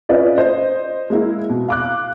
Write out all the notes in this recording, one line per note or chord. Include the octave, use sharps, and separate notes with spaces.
C#4 F4 B4 D5 D#5
C5 D#5
G#3 A#3 E4
B2
F5 D6 F#6